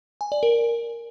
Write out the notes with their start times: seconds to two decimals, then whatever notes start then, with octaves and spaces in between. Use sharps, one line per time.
0.21 G#5
0.32 D5
0.43 A#4